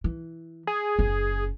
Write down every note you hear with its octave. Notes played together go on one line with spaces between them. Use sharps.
E3
G#4
F#1 C#4